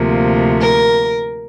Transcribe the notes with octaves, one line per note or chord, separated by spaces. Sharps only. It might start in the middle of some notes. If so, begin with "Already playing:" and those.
Already playing: D2 C3 F3 A#3
A#4